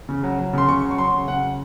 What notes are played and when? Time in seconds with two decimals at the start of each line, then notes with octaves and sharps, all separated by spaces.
0.09 C#3
0.23 F#3
0.39 F#3
0.53 C#3 C6
0.68 C#3 C#6
0.84 F#3
0.91 C#6
0.98 F#3 C6
1.13 C#3
1.28 C#3 F#5
1.43 F#3